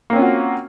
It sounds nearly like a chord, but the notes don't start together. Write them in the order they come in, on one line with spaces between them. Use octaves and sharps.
A#3 C4 C#4 F4 F#4